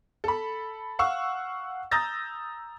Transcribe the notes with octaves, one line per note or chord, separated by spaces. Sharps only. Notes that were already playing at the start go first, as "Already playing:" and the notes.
A4 B5
F5 F#5 C#6 E6
A#5 D#6 E6 G6 A6 A#6